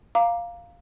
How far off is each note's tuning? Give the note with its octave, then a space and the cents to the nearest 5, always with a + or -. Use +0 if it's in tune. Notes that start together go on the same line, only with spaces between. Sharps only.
F5 +0 A#5 +5 D6 +0